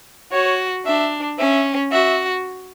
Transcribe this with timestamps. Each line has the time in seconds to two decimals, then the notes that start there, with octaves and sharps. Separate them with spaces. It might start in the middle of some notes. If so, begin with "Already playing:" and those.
0.32 F#4 C#5
0.86 D4 E5
1.39 C#4 E5
1.92 F#4 E5